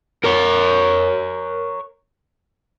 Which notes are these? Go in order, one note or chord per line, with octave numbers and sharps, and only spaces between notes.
A#4 C#5